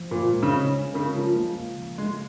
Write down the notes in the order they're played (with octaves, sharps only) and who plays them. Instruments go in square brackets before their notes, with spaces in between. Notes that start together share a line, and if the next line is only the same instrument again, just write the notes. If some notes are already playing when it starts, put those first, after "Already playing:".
Already playing: [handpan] F3
[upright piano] A#2 [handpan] A#4
[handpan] G#3
[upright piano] C#3
[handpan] C#4
G#3
[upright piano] C#3 [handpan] A#4
[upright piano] F3 [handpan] G#3
[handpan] A#3
C#3
F3
[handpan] C#3 [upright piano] G#3